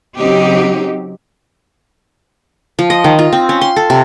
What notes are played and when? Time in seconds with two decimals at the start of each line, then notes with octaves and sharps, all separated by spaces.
0.16 C#3 F#3 C4 D#4 G4
2.79 F3
2.90 D#5
3.04 D#3
3.19 F4
3.33 C4
3.49 C#4
3.61 C6
3.76 A4
3.90 C3